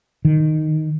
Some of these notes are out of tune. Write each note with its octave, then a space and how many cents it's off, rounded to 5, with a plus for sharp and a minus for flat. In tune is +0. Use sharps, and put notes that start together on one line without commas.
D#3 -5